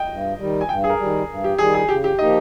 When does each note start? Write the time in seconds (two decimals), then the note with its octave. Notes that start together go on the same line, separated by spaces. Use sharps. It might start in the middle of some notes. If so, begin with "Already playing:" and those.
Already playing: D#5 G5
0.10 G2
0.39 D#3 G3
0.61 G#5
0.69 G2 G5
0.84 G#4
0.90 A#4
0.99 D#3 G3
1.29 G2
1.44 G4
1.58 D#3 G3 G#4
1.74 G#4
1.88 C#3 G4
2.04 G4
2.19 F3 A#3 D#4 G4 D#5